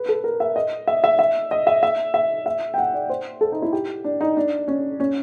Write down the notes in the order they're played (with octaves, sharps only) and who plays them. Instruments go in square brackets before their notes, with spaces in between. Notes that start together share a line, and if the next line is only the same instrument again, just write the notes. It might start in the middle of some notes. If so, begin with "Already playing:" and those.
Already playing: [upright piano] B4
A4
A#4
E5
D#5
E5
E5
E5
D#5
E5
E5
E5
E5
G5
F#5
D5
C5
A4
D#4
E4
G4
D4
D#4
D4
C#4
C#4